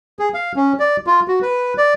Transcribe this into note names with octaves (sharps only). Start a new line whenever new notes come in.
G#4
F5
C#4
D5
F4
F#4
B4
D5